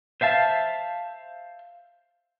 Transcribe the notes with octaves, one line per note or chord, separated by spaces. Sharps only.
C5 E5 F5 A5